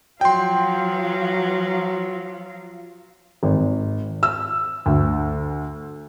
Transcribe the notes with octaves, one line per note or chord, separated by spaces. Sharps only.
F3 F#3 F5 G5 C6
G#1
E6
D2